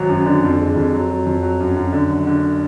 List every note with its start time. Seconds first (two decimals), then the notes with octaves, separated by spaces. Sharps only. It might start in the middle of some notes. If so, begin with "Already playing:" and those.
Already playing: G#1 F#3
0.09 F#2
0.26 D3
0.44 F2
0.60 G#3
0.76 F2
0.93 F#3
1.10 F#3
1.26 F2
1.43 F#3
1.60 F#2
1.76 F#2
1.93 D3
2.10 F#1
2.27 D3